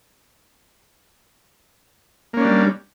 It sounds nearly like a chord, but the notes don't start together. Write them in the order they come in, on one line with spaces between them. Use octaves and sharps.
A#3 C#4 D4 G3